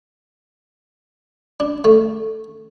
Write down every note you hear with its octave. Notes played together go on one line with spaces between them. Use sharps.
D4
A3